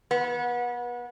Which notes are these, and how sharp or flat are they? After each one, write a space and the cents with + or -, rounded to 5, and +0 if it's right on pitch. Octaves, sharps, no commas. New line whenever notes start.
B3 -30